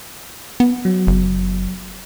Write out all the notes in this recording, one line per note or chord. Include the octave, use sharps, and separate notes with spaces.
B3
F#3
F#1